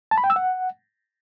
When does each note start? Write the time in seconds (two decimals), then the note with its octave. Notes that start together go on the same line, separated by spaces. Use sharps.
0.11 A5
0.18 B5
0.24 G5
0.30 E6
0.36 F#5